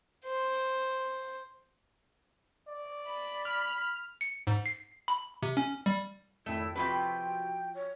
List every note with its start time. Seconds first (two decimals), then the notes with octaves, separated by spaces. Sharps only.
0.25 C5
2.68 D5
3.07 B5
3.45 F6
4.21 C#7
4.47 G#2
4.66 C7
5.08 B5
5.43 C3
5.57 C#4
5.86 G3
6.46 G#1 F2 A3 E4 G5
6.76 C3 F3 F4 F#4 B4 G5
7.75 C#5